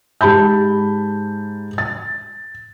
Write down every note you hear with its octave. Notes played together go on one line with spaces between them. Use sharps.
G#2 G4 A5 B5 G6
A6